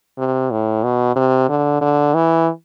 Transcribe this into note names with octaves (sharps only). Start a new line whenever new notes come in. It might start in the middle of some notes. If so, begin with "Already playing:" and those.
C3
A2
B2
C3
D3
D3
E3